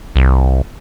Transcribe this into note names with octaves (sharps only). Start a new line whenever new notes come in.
C2